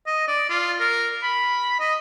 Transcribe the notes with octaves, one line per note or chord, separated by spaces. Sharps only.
D#5
D5
F4
A#4
B5
D#5